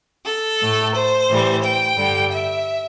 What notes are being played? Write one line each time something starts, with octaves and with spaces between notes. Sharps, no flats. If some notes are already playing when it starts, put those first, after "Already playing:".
A4
A2 A3
C5
A2 E3 G3
G5
G2 D3 G3
E5